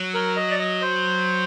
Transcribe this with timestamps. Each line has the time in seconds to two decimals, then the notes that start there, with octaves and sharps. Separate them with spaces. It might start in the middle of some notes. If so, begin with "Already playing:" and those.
Already playing: F#3
0.14 A#4
0.36 D#5
0.51 D5
0.59 D#5
0.82 C5